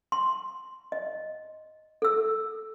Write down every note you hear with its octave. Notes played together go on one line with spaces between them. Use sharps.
C6
D#5
A4 E6